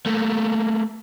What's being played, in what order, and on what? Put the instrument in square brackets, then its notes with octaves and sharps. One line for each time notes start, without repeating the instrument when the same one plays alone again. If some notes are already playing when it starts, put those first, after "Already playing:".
[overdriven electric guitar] A3 A#3